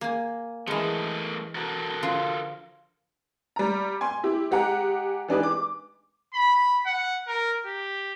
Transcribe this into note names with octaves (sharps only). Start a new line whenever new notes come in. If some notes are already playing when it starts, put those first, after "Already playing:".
A#3 G#5
E3 G#3 A3 A#4 D#5
F#4 A4 A#4
D3 F3 F4
G3 A#5
G#5 C6
E4 G4
G#3 G4 F#5 A#5
E3 G#3 D4 D#4 G4 B4
D6
B5
F#5
A#4
G4